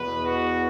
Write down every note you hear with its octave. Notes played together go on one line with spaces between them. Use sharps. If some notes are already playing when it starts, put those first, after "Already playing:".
Already playing: E2 B2 B3 B4
F#4